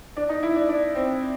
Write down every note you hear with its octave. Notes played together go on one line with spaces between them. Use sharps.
D4
D#4
E4
D4
D4
C4